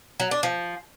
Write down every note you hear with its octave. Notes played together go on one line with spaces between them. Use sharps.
F#3
D4
F3